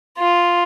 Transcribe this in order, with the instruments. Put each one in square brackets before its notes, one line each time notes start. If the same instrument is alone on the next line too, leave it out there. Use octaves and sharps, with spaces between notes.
[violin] F4